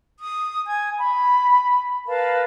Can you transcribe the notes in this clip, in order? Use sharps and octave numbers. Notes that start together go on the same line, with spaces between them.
D#6
G#5 G#6
B5
A#4 B4 F5 A5